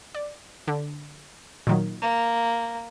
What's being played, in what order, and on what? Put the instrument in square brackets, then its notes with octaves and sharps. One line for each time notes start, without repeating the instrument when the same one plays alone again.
[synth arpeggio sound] D5
D3
A#2 D#3 F#3
[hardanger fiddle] A#3